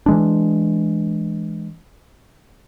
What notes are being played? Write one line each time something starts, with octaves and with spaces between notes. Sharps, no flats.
E3 G#3 D4